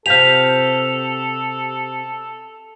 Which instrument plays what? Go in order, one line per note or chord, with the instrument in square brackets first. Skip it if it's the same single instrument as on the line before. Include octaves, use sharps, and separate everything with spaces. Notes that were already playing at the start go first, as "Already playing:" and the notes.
[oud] C3 C4 F4 [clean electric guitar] G4 F5 [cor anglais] A4 [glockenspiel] F7